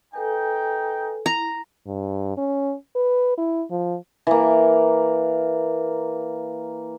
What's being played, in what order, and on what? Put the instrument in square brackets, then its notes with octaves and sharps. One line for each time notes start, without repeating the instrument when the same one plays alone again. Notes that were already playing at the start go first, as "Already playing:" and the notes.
[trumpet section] D#4 G5 [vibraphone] A4 B4 G#5
[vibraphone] E4 [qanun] A#5
[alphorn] G2
C#4
B4
E4
F3
[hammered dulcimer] E3 A#3